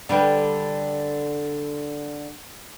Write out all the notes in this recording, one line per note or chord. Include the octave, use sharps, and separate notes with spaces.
D3 G3 B4